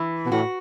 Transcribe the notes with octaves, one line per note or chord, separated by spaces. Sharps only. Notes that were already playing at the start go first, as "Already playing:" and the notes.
Already playing: E3
B2
A2 F#4